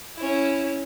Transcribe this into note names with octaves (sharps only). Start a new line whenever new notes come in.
C#4 E4